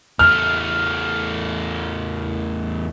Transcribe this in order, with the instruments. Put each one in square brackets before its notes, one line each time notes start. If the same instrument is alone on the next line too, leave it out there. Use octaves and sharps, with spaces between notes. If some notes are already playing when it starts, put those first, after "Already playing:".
[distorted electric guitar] E2 A3 [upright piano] F6